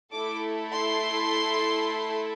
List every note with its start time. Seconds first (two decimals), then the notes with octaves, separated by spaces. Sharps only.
0.12 A3 E4 A4 D6
0.71 C6